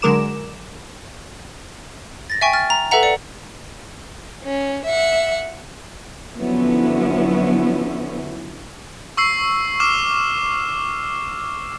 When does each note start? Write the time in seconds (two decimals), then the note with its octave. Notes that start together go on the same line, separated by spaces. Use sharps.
0.02 D3 F#3 G#3 A#4 D6 E7
2.30 A6 A#6
2.41 E5 G5 G#5 C#6
2.53 F6 A6
2.70 A#5
2.91 A4 B4 E5 F#5 A#5
3.03 D5 C#7
4.45 C#4
4.85 E5 F#5
6.36 D3 F3 F#3 B3 C#4 E4
9.17 C#6 E6 C7
9.80 D6 F6 E7